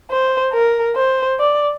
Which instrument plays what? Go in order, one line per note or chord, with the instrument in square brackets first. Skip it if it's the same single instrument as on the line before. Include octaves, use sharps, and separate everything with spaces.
[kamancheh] C5
A#4
C5
D5